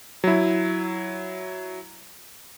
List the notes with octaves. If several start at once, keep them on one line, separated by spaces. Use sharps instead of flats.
F#3 E4